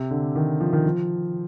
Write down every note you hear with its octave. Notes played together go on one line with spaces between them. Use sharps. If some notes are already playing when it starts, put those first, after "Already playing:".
Already playing: C3
D3
D#3
F3
D#3
F3